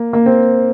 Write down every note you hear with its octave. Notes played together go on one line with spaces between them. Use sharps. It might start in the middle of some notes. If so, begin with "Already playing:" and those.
Already playing: A#3
A#3
C4